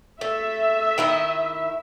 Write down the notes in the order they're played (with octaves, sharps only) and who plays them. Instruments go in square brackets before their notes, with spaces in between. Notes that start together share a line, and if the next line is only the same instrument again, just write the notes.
[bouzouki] A3 [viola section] E5
[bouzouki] D#3 E4 D#5